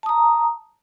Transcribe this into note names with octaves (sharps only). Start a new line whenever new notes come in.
A5 A#5 D#6